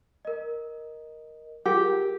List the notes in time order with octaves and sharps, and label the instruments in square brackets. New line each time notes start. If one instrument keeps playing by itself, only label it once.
[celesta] A#4 D#5
[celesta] F4 G#4 A#4 [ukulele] G4